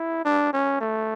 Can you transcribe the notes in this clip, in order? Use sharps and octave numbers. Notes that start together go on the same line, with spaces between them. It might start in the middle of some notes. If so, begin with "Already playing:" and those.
Already playing: E4
D4
C#4
A3